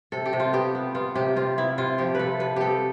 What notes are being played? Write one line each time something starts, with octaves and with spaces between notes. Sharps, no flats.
C3 A4
G4
C3
F4
B3 G4
B3
B3 F4
C3 G4
C3 F4
B3 E4
C3 F4
F3 G4
C3 A4 B4
C3 B4
B3 G4 A4